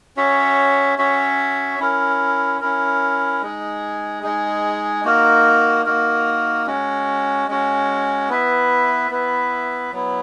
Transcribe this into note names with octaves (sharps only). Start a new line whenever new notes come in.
C#4 F#4 C#5 E5
C#4 F#4 C#5 E5
C#4 E4 A#4
C#4 E4 A#4
G#3 D#4 G#4
G#3 D#4 G#4
A#3 D#4 F#4 A#4
A#3 D#4 F#4 A#4
G#3 C#4 F#4
G#3 C#4 F#4
B3 E4 B4 E5
B3 E4 B4 E5
F#3 B3 E4